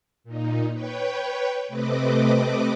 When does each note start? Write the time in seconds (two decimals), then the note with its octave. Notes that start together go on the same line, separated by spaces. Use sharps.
0.24 A#2 D#4
0.73 B4 C#5 G5
1.68 C3 A3 C4 B4 D#5 D6